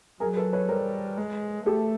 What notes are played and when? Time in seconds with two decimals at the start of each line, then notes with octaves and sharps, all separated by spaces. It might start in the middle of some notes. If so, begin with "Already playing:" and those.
0.20 F#3 G#4 A#4
0.37 A4 B4
0.53 B4 C#5
0.68 G3 A#4 C5
1.17 G#3
1.66 A3 G4 A4